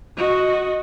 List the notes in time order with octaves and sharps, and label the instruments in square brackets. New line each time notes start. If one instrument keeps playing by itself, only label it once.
[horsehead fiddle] F#4 D#5